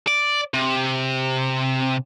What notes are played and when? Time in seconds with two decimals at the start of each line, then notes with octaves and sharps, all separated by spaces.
0.08 D5
0.54 C3